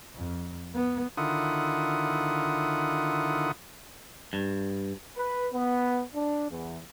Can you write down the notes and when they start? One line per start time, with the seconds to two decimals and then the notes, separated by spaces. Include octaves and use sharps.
0.15 F2
0.74 B3
1.17 D3 D#3 E4 F4 F#5 D#6
4.33 G2
5.17 B4
5.53 B3
6.15 D4
6.51 E2